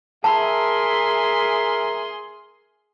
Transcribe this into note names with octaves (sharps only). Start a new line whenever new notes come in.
G#4 A#4 E5 A5 B5 C6